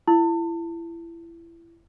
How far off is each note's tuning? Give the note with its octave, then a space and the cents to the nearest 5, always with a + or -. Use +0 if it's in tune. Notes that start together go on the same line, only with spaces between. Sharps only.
E4 +25